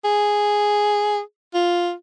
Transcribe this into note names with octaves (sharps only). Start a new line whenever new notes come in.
G#4
F4